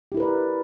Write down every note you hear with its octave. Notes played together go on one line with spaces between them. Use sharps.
E4 G4 A#4 B4 D5